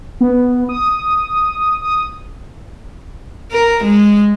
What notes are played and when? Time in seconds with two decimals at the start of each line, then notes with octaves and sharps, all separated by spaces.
0.21 B3
0.69 D#6
1.82 D#6
3.52 A#4
3.84 G#3